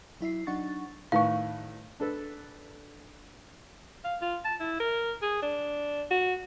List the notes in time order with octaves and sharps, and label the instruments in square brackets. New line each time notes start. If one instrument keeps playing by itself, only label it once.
[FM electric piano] F#3 E4 E5 C7
F#3 D4 D#4 F#5 C#6 A6
[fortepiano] A2 D#3 B4 [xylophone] F5 C#6
[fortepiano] D4 A4 B4
[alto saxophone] F5
F4
A5
E4
A#4
G#4
D4
F#4